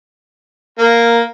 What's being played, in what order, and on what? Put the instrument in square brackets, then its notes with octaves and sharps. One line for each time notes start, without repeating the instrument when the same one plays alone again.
[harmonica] A#3